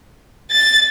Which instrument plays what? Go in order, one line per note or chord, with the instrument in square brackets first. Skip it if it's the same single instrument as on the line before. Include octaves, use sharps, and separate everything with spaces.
[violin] A6